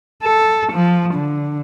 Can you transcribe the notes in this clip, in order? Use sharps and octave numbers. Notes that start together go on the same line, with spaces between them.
A4
F3
D3